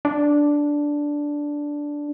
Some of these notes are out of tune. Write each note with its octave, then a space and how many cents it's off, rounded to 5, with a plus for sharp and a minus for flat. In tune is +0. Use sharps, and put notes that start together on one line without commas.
D4 -5